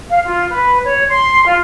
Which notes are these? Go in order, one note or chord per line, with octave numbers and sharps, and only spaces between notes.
F5
F4
B4
C#5
C6
F4